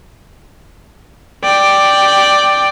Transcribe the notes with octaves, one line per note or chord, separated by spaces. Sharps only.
D5 G5